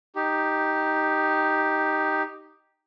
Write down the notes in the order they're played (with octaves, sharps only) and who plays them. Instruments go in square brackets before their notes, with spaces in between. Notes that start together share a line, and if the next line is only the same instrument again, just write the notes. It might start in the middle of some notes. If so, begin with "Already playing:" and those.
[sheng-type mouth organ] D#4 G4